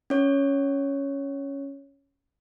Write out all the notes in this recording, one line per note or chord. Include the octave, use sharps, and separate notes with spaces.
C#4 C#5